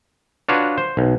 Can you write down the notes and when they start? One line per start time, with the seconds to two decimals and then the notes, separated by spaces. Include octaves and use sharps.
0.49 D4 F4 F#4 B4 C#5
0.78 C5
0.97 B1